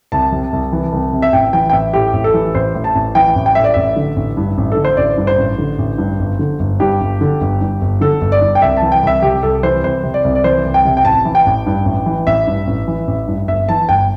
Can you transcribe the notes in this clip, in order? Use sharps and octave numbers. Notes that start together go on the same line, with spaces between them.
C2 A5
C3
C2
E3
C2
C3
E5
A1 G5
E3 G5
G5
A1 E5
A2 G4
A1
A4
E3
A1 C5
A2
A5
A1
E3 G5
A1
G5
A2 E5
D5
A1 E5
D3
A1
G2
A1
D3 A4
C5
A1 D5
G2
C5
A1
D3
A1
G2
G1
D3
G1
G2 G4
G1
D3
G1
G2
G1
D3 A4
G1
D5
G2
G5
C2 E5
A5
E3
G5
C2 E5
C3 G4
C2 A4
E3 C5
C2 C5
C3
D5
C2
D5
E3 C5
C2
G5
C3
G5
A1 A5
E3
G5
A1
G2
A1
E3
A1 E5
G2
A1
E3
A1
G2
G1 E5
E3 A5
G1 G5